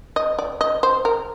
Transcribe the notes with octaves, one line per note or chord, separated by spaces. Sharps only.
D#5
D5
D#5
C5
A#4